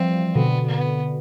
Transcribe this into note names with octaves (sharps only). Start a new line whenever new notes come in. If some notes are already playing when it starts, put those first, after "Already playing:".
Already playing: E3 F3 G3 C4
B2 D3 B3
B3